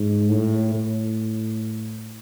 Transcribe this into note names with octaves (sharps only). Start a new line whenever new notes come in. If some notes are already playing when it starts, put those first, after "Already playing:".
Already playing: G#2
A2
A2